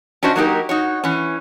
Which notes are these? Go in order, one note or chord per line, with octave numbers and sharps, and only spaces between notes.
C#4 D4 F#4 C5 D#5
F#3 A#3 D#4 F4 G4 A#4
D#4 F#4 C#5
E3 C#4